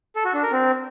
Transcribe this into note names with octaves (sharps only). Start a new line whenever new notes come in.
A4
F#4
D4
A#4
C4